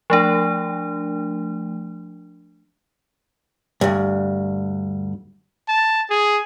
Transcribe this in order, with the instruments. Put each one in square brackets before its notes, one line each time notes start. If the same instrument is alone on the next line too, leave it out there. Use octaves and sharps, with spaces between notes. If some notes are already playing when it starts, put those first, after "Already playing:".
[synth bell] F3 A3 D4
[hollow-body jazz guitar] D2 G2
[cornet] A5
G#4